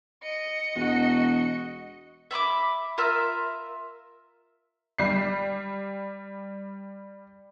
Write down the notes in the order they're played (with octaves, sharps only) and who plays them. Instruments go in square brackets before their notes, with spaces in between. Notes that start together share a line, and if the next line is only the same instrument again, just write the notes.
[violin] D#5 C#7
[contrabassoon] E1 [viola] F#4
[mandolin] E5 B5 C#6 D6
F4 A#4 E5 F6
[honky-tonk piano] G3 C7